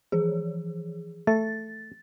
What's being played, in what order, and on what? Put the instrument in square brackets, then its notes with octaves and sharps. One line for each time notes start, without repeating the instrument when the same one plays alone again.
[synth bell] E3 F3 G#4
[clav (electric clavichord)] A3 [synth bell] A6